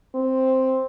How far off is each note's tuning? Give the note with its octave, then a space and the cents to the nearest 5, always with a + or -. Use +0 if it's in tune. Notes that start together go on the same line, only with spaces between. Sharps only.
C4 +0